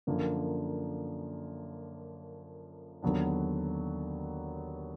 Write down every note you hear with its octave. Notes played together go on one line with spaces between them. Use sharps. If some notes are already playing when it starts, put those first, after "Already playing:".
F#2 D3 F3 A#3
D#2 D3 F#3 B3 D4